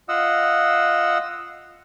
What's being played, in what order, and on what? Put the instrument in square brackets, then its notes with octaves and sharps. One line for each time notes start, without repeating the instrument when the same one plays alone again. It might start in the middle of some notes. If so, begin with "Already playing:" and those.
[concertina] F4 D#5 F#5 E6